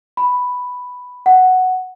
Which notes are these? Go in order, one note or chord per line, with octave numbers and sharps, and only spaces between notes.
B5
F#5